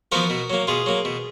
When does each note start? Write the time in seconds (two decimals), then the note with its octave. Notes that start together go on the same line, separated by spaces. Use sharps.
0.12 F3 B3 F#4 A#4
0.30 B2
0.50 F#3 A#3
0.67 B2 F4 G#4
0.86 F#3 A#3
1.05 B2